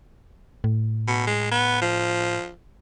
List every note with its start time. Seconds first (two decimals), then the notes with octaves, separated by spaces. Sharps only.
0.64 A2
1.07 B2
1.27 G#3
1.51 B3
1.82 F3